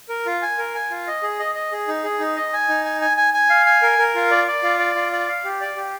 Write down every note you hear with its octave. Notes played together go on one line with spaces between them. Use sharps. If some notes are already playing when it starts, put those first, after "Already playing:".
A#4
F4
G#5
A#4
G#5
F4
D#5
G#4
D#5
D#5
G#4
D#4
G#4
D#4
D#5
G#5
D#4
G#5
G#5
G#5
G#5
F5
G#5
A#4
A#4
F4
D5
D5
F4
D5
F4
D5
F5
G4
D5
G4